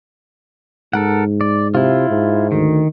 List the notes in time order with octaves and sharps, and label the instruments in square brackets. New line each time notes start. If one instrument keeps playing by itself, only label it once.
[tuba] G#2 [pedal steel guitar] A4 A#4 F#5
[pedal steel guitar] D5
[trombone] C3 [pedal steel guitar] E4 F4
[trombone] G#2
[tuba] D2 [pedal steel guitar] D#3